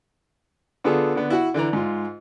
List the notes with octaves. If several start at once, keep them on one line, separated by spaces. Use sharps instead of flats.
D3 B3 F4 G#4 A4
D3 B3
E4 F#4
D3 E3 D5 A#5
G#2 F4